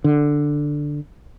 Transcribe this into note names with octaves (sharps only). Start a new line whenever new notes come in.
D3